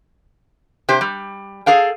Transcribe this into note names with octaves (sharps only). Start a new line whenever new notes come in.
C3 G4 C5
G3
G#4 A4 F5 G5